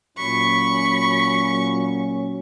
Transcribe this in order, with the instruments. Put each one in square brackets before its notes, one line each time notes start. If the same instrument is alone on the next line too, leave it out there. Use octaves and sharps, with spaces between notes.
[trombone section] A#2 F#3 C#4 [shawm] B5 [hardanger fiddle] C#6